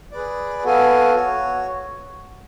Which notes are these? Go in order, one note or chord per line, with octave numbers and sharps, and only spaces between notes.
G#4 B4 D5
B3 F#4 A4 F5 G#5
F#4 C#5